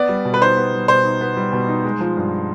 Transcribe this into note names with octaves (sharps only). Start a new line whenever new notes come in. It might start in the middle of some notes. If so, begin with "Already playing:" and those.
Already playing: B3 D5
G3
B2
B4
D#4 C5
B3
G3
B2 C5
D#4
B3
G3
B2
D#4
G#3
F3
G2